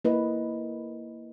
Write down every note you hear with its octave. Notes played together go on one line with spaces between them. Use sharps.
A#3 E4 B4 D#5